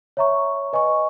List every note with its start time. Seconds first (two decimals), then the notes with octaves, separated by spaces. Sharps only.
0.17 C#5 E5 A#5 C#6
0.73 B4 D#5 G#5 C#6